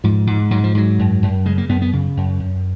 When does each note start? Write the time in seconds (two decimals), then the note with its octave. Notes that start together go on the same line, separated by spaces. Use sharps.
0.04 G#2 F3
0.27 G#2
0.51 G#2 F#3
0.64 F3
0.75 G#2 F#3
0.99 F#2
1.23 F#2
1.45 C#3 G#3
1.58 A#3
1.69 F#2 B3
1.82 B3
1.93 C#3
2.17 F#2
2.40 F#2